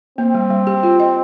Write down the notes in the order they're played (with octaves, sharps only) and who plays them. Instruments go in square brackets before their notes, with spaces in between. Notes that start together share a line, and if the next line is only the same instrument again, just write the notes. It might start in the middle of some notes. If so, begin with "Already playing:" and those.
[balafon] A#3 [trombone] C4
[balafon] G3
G3
G4
F4
D#5